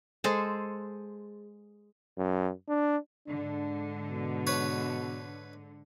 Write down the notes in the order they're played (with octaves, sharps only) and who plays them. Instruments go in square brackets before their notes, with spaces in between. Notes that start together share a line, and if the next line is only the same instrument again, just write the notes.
[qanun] G#3 G#4 A4 C5
[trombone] F#2
D4
[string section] G#2 D3 [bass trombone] D4
[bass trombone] B2
[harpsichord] B4 C#5